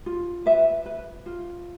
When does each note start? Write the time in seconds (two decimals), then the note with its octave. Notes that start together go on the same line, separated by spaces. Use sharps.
0.06 F4
0.46 B4 E5
0.86 B4
1.26 F4